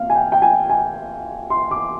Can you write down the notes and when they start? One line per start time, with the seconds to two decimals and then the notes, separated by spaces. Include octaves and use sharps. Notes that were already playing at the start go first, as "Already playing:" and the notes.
Already playing: A#2 C4 F5
0.10 G#5
0.16 G5
0.32 G5
0.42 G#5
0.69 G#5
1.50 C6
1.71 D6